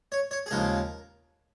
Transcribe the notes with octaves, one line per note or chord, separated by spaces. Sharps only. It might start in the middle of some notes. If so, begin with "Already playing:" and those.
C#5
C#5
G#4
D#2 C#3 F3 G#3 A#4